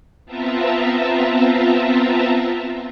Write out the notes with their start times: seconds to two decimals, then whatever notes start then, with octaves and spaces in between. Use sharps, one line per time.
0.26 B3 C4 F4 E5 A5 A#5